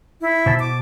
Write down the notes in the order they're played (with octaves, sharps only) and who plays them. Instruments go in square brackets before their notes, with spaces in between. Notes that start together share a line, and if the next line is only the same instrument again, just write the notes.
[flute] E4
[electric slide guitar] B2 C5 A5
[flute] D6